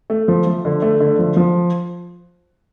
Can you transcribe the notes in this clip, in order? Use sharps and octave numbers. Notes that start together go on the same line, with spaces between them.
A3
F3
F3
D3
A3
D3
F3
F3